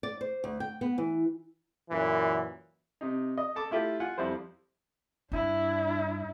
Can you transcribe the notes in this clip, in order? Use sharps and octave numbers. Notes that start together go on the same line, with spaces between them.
D5
C5
D2
G5
B3
E3
F#2 A#2 E3
C3 D#4
D#5
A4 A5 D6
A3 E4 F4 G4
F4 F#5 G#5
F2 G3 E4 C5
G2 D4 E4